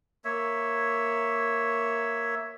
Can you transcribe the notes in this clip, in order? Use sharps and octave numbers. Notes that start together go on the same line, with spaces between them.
A#3 C#5 E5